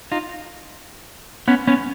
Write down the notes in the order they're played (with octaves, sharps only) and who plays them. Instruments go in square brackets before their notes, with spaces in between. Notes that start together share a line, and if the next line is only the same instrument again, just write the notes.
[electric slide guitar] D#4 F4
B3 C#4
B3 C#4